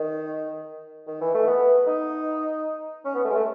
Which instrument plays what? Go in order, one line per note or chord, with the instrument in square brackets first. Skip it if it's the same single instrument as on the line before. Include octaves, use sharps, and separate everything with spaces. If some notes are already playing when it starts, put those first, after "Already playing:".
Already playing: [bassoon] D#3
D#3
E3
A3
B3
D#4
C#4
B3
A3
G#3
A3